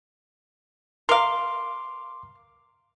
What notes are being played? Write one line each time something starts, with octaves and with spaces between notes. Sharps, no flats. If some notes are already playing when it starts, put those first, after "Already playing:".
A#4 F5 C6 D6